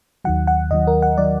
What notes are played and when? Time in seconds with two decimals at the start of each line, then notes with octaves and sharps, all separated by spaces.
0.25 D#2 D#3 F#3 F#5
0.47 F#5
0.71 D#2 D#3 F#3 D#5
0.87 A#4
1.02 F#5
1.18 D#3 F#3 D5